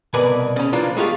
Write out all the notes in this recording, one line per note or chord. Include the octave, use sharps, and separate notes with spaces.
C2 B2 A#4 B4 D5 G#5
C#3 C#4
E3 F3 A#3 D4 F4
G#3 A3 F4 G4 F5